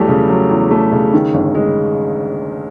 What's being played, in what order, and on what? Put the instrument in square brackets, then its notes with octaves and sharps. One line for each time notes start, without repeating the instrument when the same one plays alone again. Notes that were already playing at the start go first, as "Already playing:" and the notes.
Already playing: [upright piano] E2 F#3 G3 A3 G4
C#3
F#3
E2
A3
C#3
D#3
G1
G#3